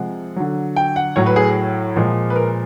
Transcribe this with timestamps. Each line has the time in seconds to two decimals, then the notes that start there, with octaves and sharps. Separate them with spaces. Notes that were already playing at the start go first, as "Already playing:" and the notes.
Already playing: C3 F3 G#3 F#5
0.36 D3 F#3
0.76 G5
0.96 F#5
1.16 A2 F#3 C#5
1.26 B4
1.36 G#4
1.96 A#2 F3 G#3
2.30 B4
2.36 A#4